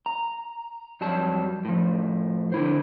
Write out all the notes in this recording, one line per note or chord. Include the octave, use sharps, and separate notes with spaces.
A#5
F2 F#3 G3 A5
A2 F3
D3 E4 C5